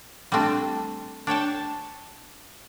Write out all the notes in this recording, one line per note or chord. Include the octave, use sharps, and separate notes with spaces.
G3 A3 C4 D4
D4 C#5 G5 A5